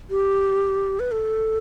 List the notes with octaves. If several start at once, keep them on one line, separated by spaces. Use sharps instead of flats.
G4
B4
A4